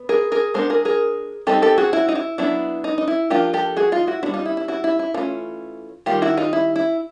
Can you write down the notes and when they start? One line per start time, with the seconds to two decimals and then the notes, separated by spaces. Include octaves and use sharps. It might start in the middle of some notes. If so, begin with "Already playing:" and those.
Already playing: B3
0.09 G#4 A#4
0.32 G#4 A#4
0.54 G#3 B3 D4 A#4 C5
0.70 G#4 A#4
0.85 G#4 A#4
1.47 G3 C4 D#4 G4 A4
1.62 G4 A4
1.78 F#4 G#4
1.93 E4 F#4
2.09 D#4
2.15 E4
2.38 F#3 B3 D4 E4
2.84 D#4
2.98 D#4
3.08 E4
3.30 F3 A#3 D4 F4 G4
3.54 G4 A4
3.77 F#4 G#4
3.92 D#4 F4
4.07 E4 F#4
4.23 G3 B3 D4 E4 F#4
4.34 D#4 F4
4.46 E4
4.57 E4
4.68 E4 F#4
4.84 E4
4.99 E4
5.14 E3 A3 C#4 D#4 F4
6.06 D#3 G3 A#3 F4 G4
6.22 E4 F#4
6.37 D#4 F4
6.53 E4
6.76 E4